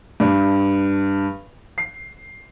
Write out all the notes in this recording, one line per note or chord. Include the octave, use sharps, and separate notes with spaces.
G2
C7